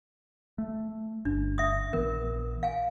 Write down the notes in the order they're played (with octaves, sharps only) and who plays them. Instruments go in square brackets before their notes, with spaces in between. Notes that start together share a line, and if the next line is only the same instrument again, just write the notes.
[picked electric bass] A3
[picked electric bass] G1 [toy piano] D4
[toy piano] E5 D#6
[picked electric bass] A#1 E3 B3 [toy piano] A#4
[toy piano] F5 G#5